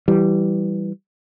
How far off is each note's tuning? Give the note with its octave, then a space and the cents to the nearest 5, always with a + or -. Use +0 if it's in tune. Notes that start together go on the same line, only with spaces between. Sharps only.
E3 +0 G3 -15